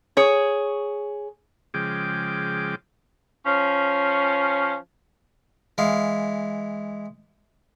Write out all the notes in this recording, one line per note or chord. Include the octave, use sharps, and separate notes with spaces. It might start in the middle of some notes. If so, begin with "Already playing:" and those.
G#4 C#5
C#3 F3 G#3 G5 D6
F3 C#4
E3 G#3 F5